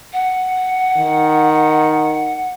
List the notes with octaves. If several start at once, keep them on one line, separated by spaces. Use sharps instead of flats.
F#5
D#3